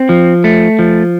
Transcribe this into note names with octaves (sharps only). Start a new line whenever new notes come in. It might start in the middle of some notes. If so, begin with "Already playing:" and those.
Already playing: C4
F3
A3
F3